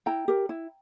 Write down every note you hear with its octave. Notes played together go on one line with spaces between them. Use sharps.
E4 G5 A#5
G4 A#4
E4